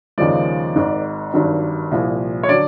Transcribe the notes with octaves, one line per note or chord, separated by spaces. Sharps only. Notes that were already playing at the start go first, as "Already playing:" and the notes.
D#2 C#3 F3 G#3 D5
G#1 G#2 D#3
G#1 G2 D#3 F#3
C2 A#2 F3
C#5
D3 F#3 D5